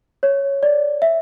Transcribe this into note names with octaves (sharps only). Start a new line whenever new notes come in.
C#5
D5
E5